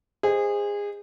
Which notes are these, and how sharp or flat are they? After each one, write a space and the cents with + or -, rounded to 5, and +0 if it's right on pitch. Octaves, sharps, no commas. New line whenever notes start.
G#4 -25 C5 +0 D#5 +0